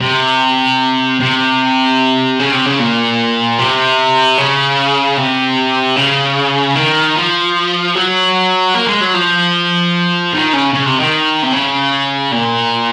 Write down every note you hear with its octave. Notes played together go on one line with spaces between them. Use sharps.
C3
C3
C#3
C3
C#3
A#2
C3
C#3
C3
C#3
D#3
F3
F#3
A#3
G#3
F#3
F3
D#3
C#3
C#3
C3
D#3
C3
C#3
A#2